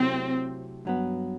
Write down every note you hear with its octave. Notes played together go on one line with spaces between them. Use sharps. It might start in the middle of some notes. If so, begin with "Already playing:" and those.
Already playing: C3 F#3 A3 C4 E4
G2 F#3 B3